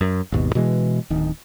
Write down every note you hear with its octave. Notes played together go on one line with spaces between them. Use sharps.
F#2
G#1 D#2 B2
B2 E3 G#3
D1 D#3